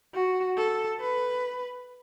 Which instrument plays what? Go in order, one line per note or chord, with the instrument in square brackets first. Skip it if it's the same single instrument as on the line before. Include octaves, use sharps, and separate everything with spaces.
[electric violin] F#4
A4
B4